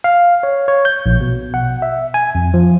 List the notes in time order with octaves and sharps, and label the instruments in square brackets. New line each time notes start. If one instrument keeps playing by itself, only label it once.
[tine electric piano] F5
C#5
C#5
G6
A#1
B2
F#5
E5
G#5
F2
F3